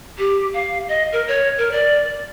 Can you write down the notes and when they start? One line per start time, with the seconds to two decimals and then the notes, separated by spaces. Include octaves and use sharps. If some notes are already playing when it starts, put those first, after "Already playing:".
0.18 G4
0.54 F5
0.88 D#5
1.12 A#4
1.28 C#5
1.58 A#4
1.72 D5